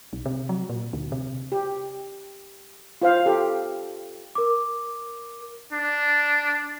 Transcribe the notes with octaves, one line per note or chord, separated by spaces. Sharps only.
B1
C3
F#3
A#2
D2
C3
G4
F4 C5 F5
G4 A4
A#4 D6
D4